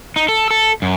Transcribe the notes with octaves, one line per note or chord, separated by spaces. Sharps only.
D#4
A4
A4
F#2